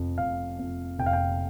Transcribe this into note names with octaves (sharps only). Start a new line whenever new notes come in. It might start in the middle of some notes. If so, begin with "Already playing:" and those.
Already playing: F1 F2 F3
F1 F5
F2 F3
F1 G5
F5
G5